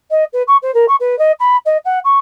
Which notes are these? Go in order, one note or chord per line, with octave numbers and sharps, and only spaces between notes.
D#5
B4
C#6
C5
A#4
C#6
B4
D#5
B5
D#5
F#5
C#6